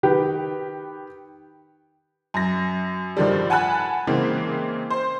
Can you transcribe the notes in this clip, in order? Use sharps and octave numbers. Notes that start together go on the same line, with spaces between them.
D#3 G4 B4
F#2 A#6
G2 D3 D#3 F3 G3
F#5 G#5 A5 B5 F#6
C#3 E3 G#3 A#3 C4
C5